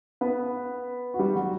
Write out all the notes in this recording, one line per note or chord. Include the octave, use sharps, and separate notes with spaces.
B3 B4
F#4
G3 G4
F#3 F#4